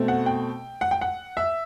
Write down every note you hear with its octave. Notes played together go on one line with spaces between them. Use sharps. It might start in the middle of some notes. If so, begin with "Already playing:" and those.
Already playing: B2 A3 C4
F#5
G5
F#5
G5
F#5
E5